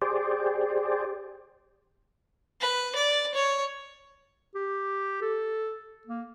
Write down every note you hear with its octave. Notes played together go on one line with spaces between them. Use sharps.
G4 G#4 C5 D5
B4
D5
C#5
G4
A4
A#3